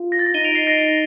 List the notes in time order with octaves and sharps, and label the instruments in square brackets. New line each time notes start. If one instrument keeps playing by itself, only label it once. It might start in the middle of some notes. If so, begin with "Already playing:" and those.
Already playing: [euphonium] F4
[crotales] A#6
A6
A#6
[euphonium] D#4 [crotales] D#7 G7
[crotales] D7 F7
C7 D#7
A#6 D7
C7